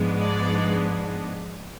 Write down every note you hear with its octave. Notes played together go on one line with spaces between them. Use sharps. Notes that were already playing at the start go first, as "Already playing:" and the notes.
Already playing: G#2 F3 G#3 B3 D4
D5